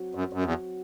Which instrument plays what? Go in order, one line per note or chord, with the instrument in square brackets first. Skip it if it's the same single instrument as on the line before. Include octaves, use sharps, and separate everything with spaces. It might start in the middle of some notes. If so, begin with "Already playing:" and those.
Already playing: [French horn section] F#3 C4 F#4
[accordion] F#2
F#2
E2